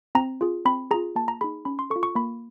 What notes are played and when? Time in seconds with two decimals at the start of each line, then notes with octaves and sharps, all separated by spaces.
0.15 C4 A#5
0.41 F4 G#4
0.65 C4 B5
0.91 F4 G#4 A#5
1.16 A#3 A5
1.28 A#5
1.41 D#4 G#4 B5
1.65 C#4 B5
1.79 C6
1.90 A4 C#6
1.96 F4
2.03 C#6
2.15 A#3 B5